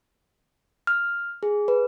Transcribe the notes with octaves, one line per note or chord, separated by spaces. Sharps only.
F6
G#4
B4